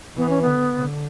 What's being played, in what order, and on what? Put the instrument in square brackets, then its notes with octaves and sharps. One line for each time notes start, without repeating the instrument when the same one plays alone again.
[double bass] E3 [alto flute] B3
[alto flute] C#4
[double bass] D3 [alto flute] B3
[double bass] D3